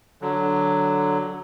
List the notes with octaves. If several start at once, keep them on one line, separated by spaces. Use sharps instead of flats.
D3 F#3